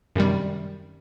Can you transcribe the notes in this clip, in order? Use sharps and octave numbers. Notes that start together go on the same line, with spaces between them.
F#2 C3 D#3 G3